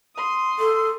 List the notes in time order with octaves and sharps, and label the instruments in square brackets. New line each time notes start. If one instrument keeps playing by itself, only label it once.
[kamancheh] C6 D#6
[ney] A4